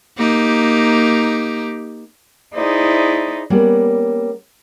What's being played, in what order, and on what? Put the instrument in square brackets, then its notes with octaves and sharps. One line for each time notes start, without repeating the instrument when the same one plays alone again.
[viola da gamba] A#3 D#4 G4
[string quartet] D#4 E4 G#4 C5 D5
[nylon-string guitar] G3 A#3 B3 C#4